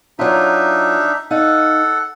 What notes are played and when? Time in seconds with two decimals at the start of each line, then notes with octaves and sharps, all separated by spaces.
0.19 F#3 D4 D#4 F4 E5
1.31 D#4 A4 F5 F#5